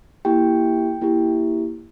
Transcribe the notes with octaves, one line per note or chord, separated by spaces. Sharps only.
A#3 E4 G4 G5
A#3 E4 G4